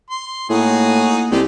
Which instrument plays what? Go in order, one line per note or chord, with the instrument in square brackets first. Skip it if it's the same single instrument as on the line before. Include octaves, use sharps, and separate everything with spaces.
[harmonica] C6
[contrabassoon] A2 [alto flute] A#3 [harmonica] D#4 F#4 G#4
[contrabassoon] C2 [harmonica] G#3 A3 G4